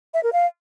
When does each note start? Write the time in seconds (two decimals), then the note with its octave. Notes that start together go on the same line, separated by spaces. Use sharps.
0.14 E5
0.23 A#4
0.33 F5